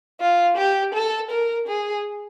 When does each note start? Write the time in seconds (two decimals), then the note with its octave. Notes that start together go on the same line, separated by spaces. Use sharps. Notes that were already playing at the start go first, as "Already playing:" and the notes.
0.20 F4
0.57 G4
0.94 A4
1.31 A#4
1.67 G#4